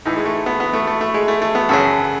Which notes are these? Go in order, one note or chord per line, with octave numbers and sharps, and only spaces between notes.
A2 E3 D#4
G#3
A3
B3
B3
A3
A3
A3
G#3
A3
A3
B3
F#2 C#3 F#3 A4